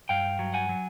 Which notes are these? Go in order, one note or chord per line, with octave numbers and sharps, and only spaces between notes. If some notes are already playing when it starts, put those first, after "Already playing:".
G2 F5 G5
F#3
F#5 G#5
F#3